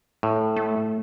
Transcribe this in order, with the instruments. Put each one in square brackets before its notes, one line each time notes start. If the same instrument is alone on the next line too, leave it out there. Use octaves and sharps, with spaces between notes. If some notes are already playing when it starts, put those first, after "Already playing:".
[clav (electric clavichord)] A2
[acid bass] A3